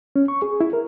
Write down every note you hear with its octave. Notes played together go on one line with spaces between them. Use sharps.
C#4
C#6
G#4
E4
A#4